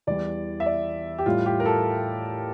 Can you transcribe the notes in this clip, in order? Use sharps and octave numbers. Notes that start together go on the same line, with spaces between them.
E2 E3 G3 D5
E5
D5
G4
A2 G3 F4
G4
A#4
A4